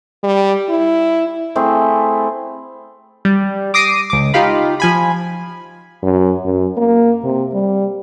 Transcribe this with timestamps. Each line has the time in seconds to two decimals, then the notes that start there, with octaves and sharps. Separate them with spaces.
0.23 G3
0.69 E4
1.55 A3 C4 E4 G#4
3.25 G3
3.74 D6 D#6 A#6 C7 D7 D#7
4.10 C#2 D6
4.34 D#4 F4 G4 F5 B5
4.80 F3 G#5 B5
6.03 F#2
6.45 F#2
6.77 A#3
7.24 C3
7.54 G3